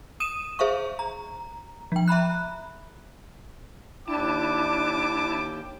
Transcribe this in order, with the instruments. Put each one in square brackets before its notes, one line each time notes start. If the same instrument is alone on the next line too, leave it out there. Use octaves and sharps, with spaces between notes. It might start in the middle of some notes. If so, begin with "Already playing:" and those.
[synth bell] D#6 D#7 E7
G#4 C5 E5 F5 C#6
A#5
F3 G5
E5 A#5 B5 F#6
[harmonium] D#2 G5 [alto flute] D4 [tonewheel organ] E4 A5 [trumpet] D6